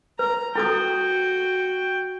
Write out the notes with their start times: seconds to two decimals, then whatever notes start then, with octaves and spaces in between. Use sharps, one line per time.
0.19 B4 A#5
0.55 E4 F#4 A4 G5 D#6